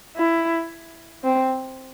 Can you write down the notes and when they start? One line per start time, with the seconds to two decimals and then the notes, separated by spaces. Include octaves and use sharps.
0.17 E4
1.24 C4